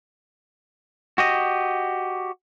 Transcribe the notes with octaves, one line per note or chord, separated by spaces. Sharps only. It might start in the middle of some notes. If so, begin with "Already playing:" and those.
F#4 G4 D#5